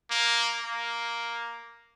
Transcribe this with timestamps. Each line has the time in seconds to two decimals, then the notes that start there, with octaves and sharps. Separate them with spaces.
0.10 A#3
0.64 A#3